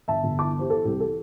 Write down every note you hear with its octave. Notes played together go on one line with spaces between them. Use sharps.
G1 E5 A5
G1
E3 A5 D6
E3 G4 C5
E3 A4
C2 G4
E3 A4